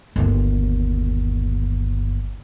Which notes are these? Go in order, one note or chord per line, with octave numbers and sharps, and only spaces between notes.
G1 D#2